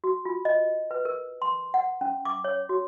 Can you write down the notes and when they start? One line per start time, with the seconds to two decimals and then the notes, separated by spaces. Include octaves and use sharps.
0.04 F#4
0.25 F4
0.45 D#5
0.91 B4
1.05 A#4
1.42 C6
1.74 F#5
2.01 C#4
2.25 D6
2.44 C#5
2.69 F#4